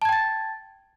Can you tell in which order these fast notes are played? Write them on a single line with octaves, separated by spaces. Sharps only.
A5 G#6 G5 A6